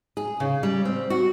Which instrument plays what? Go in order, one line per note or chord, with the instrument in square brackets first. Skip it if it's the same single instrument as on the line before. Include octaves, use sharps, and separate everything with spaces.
[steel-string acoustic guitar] G#4
C#3
G3
C4
F#4